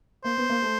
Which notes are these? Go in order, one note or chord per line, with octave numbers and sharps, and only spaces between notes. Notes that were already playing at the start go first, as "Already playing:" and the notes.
A#3 C5
B3
A#3
A3